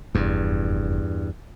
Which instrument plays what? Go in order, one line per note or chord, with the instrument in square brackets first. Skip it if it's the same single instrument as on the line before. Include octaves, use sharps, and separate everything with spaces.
[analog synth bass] F1 [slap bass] E2 G2